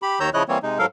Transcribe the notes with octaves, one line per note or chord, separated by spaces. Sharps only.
G4 B5
D#2 D#3 C#5 A#5 E6 G6
C#3 F3 E4 C#5 D#5 F#6
E3 G3 A#3 C4 C#5
C3 G#3 D#4
G#2 F#3 A4 A#4 F5